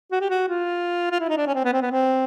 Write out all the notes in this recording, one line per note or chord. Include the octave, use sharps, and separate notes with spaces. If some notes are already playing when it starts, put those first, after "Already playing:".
F#4
G4
F#4
F4
F4
E4
D#4
D4
C#4
C4
B3
C4
B3
C4